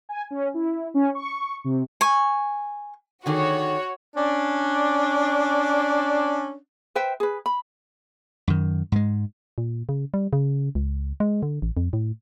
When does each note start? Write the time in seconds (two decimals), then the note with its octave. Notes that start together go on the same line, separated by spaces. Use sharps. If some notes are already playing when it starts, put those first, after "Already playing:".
0.09 G#5
0.31 C#4
0.54 E4
0.94 C#4
1.15 C#6
1.64 C3
2.01 G#5 C#6
3.26 D3 D#3 F#4 G#4 C#5
4.17 C#4 D4
6.95 B4 C5 E5 G5
7.20 G#4 B4
7.46 B5
8.48 F#2 D#3
8.92 G#2 G#3
9.58 A#2
9.89 C#3
10.14 G3
10.33 C#3
10.75 C#2
11.20 G#3
11.43 D3
11.62 A1
11.77 F2
11.93 A2